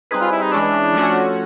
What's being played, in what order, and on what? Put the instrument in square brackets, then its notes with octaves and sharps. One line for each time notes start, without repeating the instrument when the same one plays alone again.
[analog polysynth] G3 C4 D#4 G#4 B4
[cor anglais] F4
E4
D#4
[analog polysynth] E3 G#3 C#4 E4 [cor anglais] D4
[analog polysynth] F3 A3 C#4 F#4